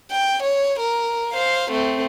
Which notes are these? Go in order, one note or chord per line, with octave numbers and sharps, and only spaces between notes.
G5
C#5
A#4
C5 F5
A3 C4